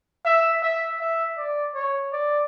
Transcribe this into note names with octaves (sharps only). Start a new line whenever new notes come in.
E5
E5
E5
D5
C#5
D5